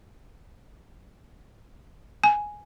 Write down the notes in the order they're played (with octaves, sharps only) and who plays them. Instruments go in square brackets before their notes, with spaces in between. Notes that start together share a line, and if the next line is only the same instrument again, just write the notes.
[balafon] G#5